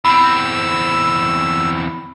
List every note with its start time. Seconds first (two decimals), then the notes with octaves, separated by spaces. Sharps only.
0.05 E2 C4 B5 E6